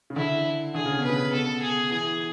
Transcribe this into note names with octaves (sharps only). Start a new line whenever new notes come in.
C#3
D3 E4
D3 G#4
C#3
B2 B4
C#3
B2 A4
G#4
E3 G#4